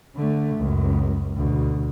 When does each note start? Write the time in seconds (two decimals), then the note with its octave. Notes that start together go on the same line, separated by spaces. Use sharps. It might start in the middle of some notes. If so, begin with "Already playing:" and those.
0.16 D3 A3
0.57 C#2 F#2
1.36 D2 B2